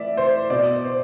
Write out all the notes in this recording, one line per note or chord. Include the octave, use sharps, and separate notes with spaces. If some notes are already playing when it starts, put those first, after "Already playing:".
Already playing: A2 E3 D5 E5
C5
B2 D5
C5